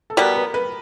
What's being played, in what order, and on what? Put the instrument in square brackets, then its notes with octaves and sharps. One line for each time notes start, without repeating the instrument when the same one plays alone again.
[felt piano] A4
[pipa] B2 G3 B3 [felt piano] A#4
[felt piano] B4
B4